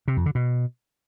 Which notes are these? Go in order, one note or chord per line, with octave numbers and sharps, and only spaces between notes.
C3
F2
D3
B2